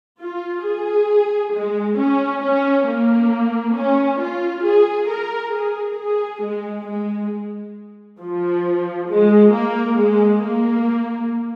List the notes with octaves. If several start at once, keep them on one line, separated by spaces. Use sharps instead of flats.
F4
G#4
G#3
C#4
C#4
A#3
C#4
F4
G#4
A#4
G#4
G#4
G#3
G#3
F3
G#3
A#3
G#3
A#3